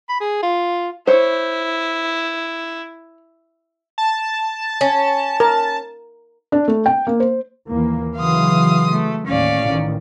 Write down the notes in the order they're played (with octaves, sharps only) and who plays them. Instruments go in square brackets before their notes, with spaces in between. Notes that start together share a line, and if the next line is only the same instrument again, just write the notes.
[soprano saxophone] B5
G#4
F4
[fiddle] E4 [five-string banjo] C5 C#5
[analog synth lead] A5
[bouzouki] C#4
[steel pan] A#4
[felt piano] D4
A3
G5
A#3
C5
[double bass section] D#2 E3 A#3
[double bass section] C#3 E3 F#3 [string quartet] F5 C6 D#6
[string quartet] A3
[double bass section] D#2 A2 [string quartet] C#4 D5 F5
[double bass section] A1 D#3